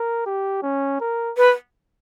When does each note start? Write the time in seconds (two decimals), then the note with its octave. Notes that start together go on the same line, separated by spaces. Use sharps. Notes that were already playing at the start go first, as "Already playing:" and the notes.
Already playing: A#4
0.26 G4
0.63 C#4
1.00 A#4
1.37 B4